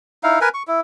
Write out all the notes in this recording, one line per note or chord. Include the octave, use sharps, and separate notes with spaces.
D#4 E4 F5
A#4 B4 G#5
C#6
E4